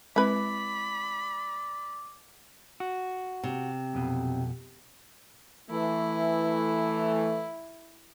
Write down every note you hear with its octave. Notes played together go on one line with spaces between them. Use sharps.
G#3 C4 E4 B4 D5 B5
F#4
C3
B1 F2 B2
E3 A3 E4